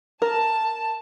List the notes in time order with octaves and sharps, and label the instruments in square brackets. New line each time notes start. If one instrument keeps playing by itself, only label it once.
[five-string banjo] A#4 [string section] A5